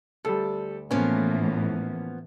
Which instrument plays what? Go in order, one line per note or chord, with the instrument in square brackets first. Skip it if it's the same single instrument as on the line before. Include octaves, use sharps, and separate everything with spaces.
[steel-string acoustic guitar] D2 [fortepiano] G3 A4
[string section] A2 E3 [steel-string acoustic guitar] F3 A#3 B3 [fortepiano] C#4